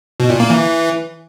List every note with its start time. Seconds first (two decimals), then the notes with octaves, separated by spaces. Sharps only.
0.20 B2
0.30 A#2
0.40 A#3
0.50 E3